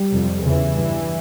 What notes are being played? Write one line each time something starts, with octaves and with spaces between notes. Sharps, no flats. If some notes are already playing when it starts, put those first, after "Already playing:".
Already playing: G3
F2 C3
E2 C#3 E3
G2